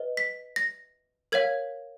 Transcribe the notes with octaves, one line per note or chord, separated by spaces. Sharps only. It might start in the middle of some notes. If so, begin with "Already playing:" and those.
Already playing: B4 D#5
B6
A#6
A#4 C#5 F5 G#6